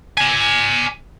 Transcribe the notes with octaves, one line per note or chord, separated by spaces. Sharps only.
D5 G#5